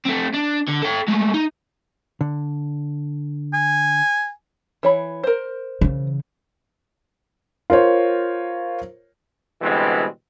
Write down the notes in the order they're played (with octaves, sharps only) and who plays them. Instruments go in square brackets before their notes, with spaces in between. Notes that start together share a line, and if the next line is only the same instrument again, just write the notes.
[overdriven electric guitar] A3 C4
D4
D3
A4 G5
G#3 A3
D#4
[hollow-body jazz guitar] D3
[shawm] G#5
[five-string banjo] E3 C#5 B5
A#4 C5
[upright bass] C#3 E3
[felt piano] F4 A#4 C5 C#5
[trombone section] B2 D3 E3 G3 G#3 C4